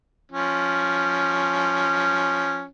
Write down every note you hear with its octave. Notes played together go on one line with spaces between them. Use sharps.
F3 C#4